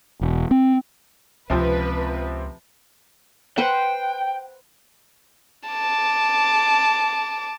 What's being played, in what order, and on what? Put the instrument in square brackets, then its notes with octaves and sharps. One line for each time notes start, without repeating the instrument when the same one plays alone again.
[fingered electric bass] E1
C4
[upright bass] C#2 [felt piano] C3 F3 C4 [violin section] B4
[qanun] B4 C5 F#5 [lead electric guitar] G5
[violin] A5 D6